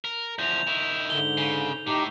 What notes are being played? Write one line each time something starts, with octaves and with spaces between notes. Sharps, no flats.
A#4
E2 F3 G6 F7
D#3 E4
G#2 D3 G7
C#3
A2 D#4 G4